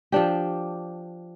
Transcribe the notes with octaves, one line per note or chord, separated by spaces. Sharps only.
F3 D4 G4